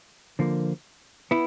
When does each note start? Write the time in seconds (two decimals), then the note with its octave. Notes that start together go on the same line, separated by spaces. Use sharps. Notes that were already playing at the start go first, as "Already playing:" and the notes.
0.39 D3 F3 A#3
1.31 B3 E4